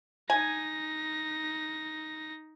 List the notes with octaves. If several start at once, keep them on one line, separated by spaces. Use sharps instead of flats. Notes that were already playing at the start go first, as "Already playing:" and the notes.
D#4 G#5 A#6